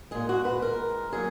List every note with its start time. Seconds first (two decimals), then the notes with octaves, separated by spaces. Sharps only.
0.11 A#2 G#3 G#4
0.29 F#4
0.45 B4
0.62 A#4
1.12 A#2 F#3 G#4